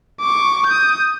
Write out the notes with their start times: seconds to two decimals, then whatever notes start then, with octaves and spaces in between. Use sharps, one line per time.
0.21 C#6 D6
0.67 D#6 G6